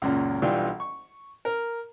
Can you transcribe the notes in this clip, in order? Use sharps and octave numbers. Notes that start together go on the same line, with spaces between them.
C#2 F#2 A#2
B1 E3 G3 D4 F4 G5
C#6
A#4